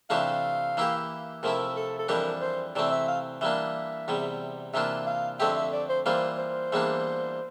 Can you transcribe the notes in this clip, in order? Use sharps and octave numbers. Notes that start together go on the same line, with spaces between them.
C3 E3 A3 D4 G4 F5
E3 A#3 E4 G4
C3 F3 A3 E4 A#4
A4
A4
F2 E3 G3 D4 G4 A#4
C5
C3 E3 A3 C4 D5
E5
F5
E3 G3 A#3 D4 E5
E2 C3 G3
C3 E3 A#3 D4 F4 E5
F5
F2 D3 A3 C4 G4 E5
E5
D5
C5
E3 G3 A#3 F4 C5
C5
E2 E3 G3 A#3 D4